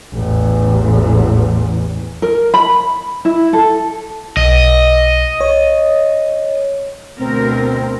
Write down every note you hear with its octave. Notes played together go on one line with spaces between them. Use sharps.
A1 E2
A#4
B5
E4
A4
B1 D#5
C#5
D2 B2 C4 A#4